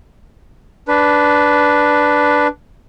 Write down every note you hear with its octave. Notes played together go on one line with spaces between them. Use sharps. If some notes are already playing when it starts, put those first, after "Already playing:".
D4 B4